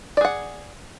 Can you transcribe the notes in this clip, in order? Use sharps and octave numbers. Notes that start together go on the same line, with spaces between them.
G#4 D5 F#5